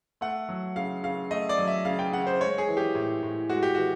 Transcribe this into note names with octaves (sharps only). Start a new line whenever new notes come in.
A3 F#5
F#3
C#3 F5
C#3 F5
A3 D#5
D5
F#3
E5
C#3 F5
G5
C#3 F#5
C5
G#3 C#5
G#4
E3
G4
A2
A2
G#3 F#4
G4
E3 F#4